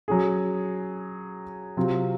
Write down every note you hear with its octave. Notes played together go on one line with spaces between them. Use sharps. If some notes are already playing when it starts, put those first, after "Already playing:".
F#3 C#4 G#4
C3 F#3 C4 F4